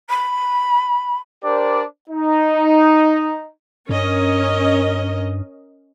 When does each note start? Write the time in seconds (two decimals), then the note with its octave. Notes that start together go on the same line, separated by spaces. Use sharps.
0.09 B5
1.43 D4 G4 A#4 C5 D5
2.09 D#4
3.89 G2 C#4 A#4 D#5